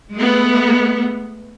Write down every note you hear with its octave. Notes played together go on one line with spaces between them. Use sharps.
G#3 A3 B3